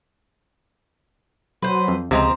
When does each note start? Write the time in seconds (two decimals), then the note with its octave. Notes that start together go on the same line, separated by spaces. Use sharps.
1.62 F#3 B4 C5
1.88 F2
2.11 C#2 C3 F3 G#3 C4 A#5